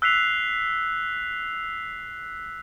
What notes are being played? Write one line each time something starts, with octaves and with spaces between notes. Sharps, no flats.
E6 F#6 B6 C7 F7